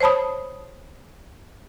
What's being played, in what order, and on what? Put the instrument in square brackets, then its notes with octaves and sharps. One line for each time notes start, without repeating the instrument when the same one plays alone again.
[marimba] C5 C#5 A5 B5 D#6